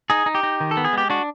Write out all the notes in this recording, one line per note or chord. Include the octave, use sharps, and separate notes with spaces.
D#4 G#4
D#4
G4
D#4
D#3
A4
B3
G#4
G#3 G4
D4 F#4